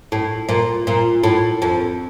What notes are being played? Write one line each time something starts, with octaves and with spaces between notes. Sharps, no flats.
A2
A#2
A#2
A2
F2